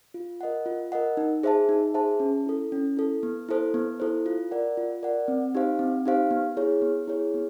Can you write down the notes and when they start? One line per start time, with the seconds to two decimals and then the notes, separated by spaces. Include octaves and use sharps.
0.14 F4
0.41 A#4 D#5 F#5
0.66 F4
0.92 A#4 D#5 F#5
1.17 D#4
1.43 G#4 C5 E5 A5
1.69 D#4
1.94 G#4 C5 E5 A5
2.20 C#4
2.46 E4 A4
2.72 C#4
2.97 E4 A4
3.23 B3
3.49 E4 A4 C5
3.74 B3
4.00 E4 A4 C5
4.26 F4
4.51 A#4 D5 F#5
4.77 F4
5.03 A#4 D5 F#5
5.28 C4
5.55 D#4 G4 C5 F5
5.79 C4
6.06 D#4 G4 C5 F5
6.31 B3
6.57 E4 G#4 C#5
6.82 B3
7.08 E4 G#4 C#5
7.34 B3